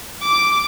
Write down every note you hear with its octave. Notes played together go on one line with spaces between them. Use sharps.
D6